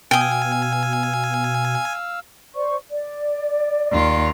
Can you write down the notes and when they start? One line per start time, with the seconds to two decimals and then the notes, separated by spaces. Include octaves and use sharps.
0.11 B2 F5 G5 G#5 D#6 E6
2.55 C5 D5 C#6
2.90 D5
3.93 D#2 F4